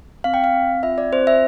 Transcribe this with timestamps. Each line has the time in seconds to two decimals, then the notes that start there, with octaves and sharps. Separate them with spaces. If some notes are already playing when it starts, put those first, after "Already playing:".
0.24 C4 F5
0.34 G5
0.44 F5
0.53 C4
0.83 F4 E5
0.98 D5
1.13 C4 C5
1.27 E5